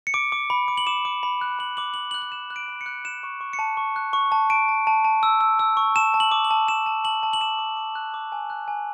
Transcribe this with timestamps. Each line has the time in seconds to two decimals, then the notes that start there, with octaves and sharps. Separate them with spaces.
0.07 C#7
0.14 D6 D7
0.32 D6
0.50 B5
0.68 D6
0.78 F#7
0.87 D6 E7
1.05 D6
1.23 B5
1.41 F#6
1.59 B5 F#7
1.77 D6 F#7
1.94 B5 F#7
2.11 F#7
2.14 F#6
2.22 F#7
2.32 F#6 E7
2.50 F#6
2.56 D7
2.68 B5
2.81 C#7
2.86 F#6
3.05 F#6 E7
3.23 C#6
3.41 C#6
3.53 C#7
3.59 A5
3.77 C#6
3.96 F#6
4.13 C#6
4.32 A5
4.50 A5 D7
4.68 A5
4.87 A5
5.05 A5
5.23 E6
5.41 E6
5.59 E6
5.77 C#6
5.96 A5 E7
6.14 A5
6.20 F#7
6.32 D6
6.44 F#7
6.51 A5
6.68 A5 E7
6.86 A5
7.05 A5 F#7
7.23 A5
7.33 F#7
7.41 D6 E7
7.59 D6
7.77 D6
7.95 F#6
8.14 D6
8.32 G#5
8.50 F#6
8.68 G#5